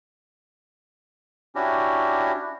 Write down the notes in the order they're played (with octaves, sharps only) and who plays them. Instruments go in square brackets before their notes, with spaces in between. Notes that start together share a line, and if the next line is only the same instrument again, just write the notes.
[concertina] C#4 D4 E4 F#4 G4